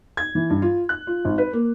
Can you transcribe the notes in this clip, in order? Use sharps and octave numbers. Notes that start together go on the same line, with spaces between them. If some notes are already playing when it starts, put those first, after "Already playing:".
G#6
E3
G2
F4
F#6
F4
G#1
B4
A#3